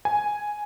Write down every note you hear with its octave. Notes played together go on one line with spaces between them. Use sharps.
G#5